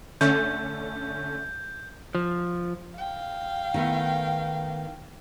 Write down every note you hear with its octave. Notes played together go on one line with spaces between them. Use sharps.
D3 A3 C#4 G6
F3
F5 G5
D#3 A3 B3